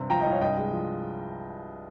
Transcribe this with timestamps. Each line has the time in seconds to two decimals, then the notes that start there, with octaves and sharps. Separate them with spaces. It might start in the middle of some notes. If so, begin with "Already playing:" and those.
Already playing: G2 C3 C4
0.10 F3 G5 A#5
0.20 D#5 G5
0.26 C2
0.31 C#5 F5
0.41 G2 D#5 G5
0.57 G#3
0.72 F3